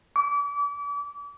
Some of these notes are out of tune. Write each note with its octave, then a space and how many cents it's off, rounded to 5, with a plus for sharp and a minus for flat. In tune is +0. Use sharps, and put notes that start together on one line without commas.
D6 -35